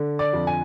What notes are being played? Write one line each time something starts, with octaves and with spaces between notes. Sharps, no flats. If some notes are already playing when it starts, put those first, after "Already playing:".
Already playing: D3
D5
F2
G#5